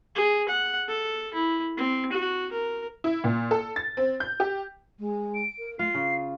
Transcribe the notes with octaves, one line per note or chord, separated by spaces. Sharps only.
G#4
F#5
A4
E4
C4
F#4
A#4
E4
A#2
A4
A6
C4
G6
G4
G#3
D7
A#4
A3 F4 C7
C#3 F5